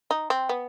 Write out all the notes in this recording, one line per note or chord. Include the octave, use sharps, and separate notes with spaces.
D#4
C4
B3